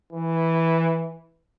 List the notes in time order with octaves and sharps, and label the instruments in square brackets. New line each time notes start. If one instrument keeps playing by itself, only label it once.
[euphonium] E3